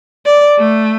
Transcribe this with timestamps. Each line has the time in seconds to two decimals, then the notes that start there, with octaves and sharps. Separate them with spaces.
0.25 D5
0.58 A3